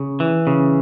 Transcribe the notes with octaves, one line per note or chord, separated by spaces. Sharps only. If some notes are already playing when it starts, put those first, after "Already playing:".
Already playing: C#3
E3
C#3